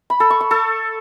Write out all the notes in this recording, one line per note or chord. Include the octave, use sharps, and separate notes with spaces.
B5
A4
C#6
C#6
A4